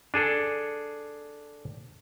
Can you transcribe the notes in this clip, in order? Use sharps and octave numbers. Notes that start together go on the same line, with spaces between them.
D4 G#4 A4